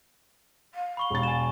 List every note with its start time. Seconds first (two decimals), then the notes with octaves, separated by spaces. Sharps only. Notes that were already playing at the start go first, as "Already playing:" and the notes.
0.74 F5
0.97 B5 C#6 G7
1.10 E1 A6
1.23 G#5 E7